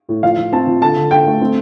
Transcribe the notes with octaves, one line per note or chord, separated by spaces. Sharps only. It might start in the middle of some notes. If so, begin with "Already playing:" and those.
A2
F3 F5
F3
C4 A5
F3
D3 A5
D3
D3 G5
A3
C4